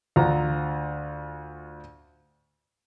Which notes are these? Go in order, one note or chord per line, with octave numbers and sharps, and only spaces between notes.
D2 F4 A#5